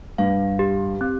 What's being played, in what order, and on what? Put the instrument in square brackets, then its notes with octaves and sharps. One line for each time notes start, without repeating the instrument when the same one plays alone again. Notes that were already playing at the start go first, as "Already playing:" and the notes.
[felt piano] G2 [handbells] F5
[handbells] G4
C4